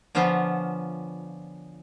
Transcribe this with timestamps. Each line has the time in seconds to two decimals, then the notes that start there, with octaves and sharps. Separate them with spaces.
0.15 D3 F3 B3 C#4 F4